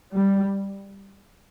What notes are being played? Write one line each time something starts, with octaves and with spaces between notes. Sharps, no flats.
G3